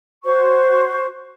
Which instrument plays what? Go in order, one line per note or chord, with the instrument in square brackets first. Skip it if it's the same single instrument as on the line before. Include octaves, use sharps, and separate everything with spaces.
[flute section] F#4 C5 C#5 C#6